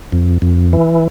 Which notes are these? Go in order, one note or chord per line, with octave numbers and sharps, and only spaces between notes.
F2
F2
E3